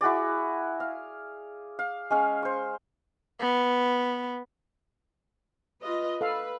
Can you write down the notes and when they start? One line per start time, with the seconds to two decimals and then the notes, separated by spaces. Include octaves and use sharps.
0.01 E4 F#4 G#4 D5
0.80 F5
1.79 F5
2.11 G#3 C#4 F5
2.42 C5 C#6
3.40 B3
5.84 F4 B4 D#5
6.21 A4 B4 F5